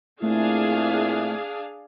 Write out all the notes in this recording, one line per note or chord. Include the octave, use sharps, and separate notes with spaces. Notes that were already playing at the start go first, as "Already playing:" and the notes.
A#2 A3 C4 D4 E4 G#4 F5